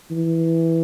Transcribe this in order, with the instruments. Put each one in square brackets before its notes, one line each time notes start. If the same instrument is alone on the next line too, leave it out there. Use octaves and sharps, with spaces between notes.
[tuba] E3